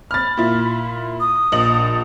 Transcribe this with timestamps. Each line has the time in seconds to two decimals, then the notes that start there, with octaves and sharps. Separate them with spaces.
0.11 B5 F6 A6
0.37 A#2 E4
1.20 D#6
1.52 A#1 D#5 F#7